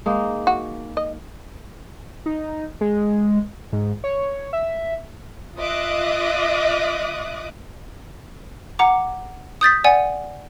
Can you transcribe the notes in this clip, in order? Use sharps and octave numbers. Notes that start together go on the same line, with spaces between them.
G#3 A#3 D#4
F#4
D#5
D#4
G#3
G#2
C#5
E5
F4 D#5 E5 D6 D#6 F#6
F#5 A#5 D6
D#6 G6 A6 B6
D5 F#5 G#5